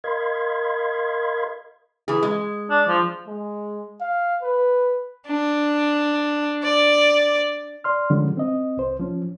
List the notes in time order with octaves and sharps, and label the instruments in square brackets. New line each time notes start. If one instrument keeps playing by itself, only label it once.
[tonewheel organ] A#4 D#5 F5 B5 C6 G#6
[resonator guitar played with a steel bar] E3 G#4
G#3
[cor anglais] D4
F3
[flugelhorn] G#3
F5
B4
[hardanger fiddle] D4
D5
[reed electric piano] D5 C6 F6
D3 D#3 F3 G3 G#3 C#4
C4 D#5
C2 C5
F3 C#4